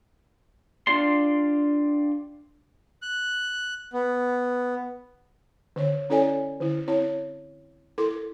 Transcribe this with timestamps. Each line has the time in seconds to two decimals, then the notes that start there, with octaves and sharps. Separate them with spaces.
0.87 D4 F4 G4 D5 C6
3.02 F#6
3.93 B3
5.76 D3 C#5
6.10 C#4 E4 A4 C#5 D5 G#5
6.60 D3 E4
6.88 C4 E4 C#5
7.98 E4 A4 A#4 C6 D6